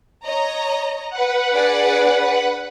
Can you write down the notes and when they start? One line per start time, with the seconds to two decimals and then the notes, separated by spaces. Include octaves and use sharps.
0.24 C#5 D#5 A#5
1.10 B4 F#5
1.53 D4 G#4 D5